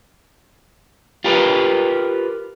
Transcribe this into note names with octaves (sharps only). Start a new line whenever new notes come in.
F4 G4 A#4 B4